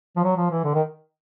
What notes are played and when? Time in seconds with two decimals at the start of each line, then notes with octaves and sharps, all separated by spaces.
0.16 F3
0.23 F#3
0.37 F3
0.51 E3
0.64 D3
0.74 D#3